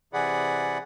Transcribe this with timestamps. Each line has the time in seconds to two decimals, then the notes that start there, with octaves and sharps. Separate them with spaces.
0.13 C3 E3 G#4 D5 F#5 B5